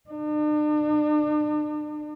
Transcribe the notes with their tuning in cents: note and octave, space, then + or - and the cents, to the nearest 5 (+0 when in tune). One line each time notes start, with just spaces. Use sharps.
D4 +40